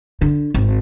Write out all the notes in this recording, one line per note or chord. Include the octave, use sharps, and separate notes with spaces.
D3
G#1